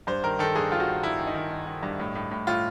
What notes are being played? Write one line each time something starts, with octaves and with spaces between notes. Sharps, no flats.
G2 C5
D#3 A#4
D#3 A4
G2 G#4
D#3 F4
F#4
D#3
G2 E4
D#3
D#4
D#3
D#3
D#3
G2
A2
A2
A2
A2 F4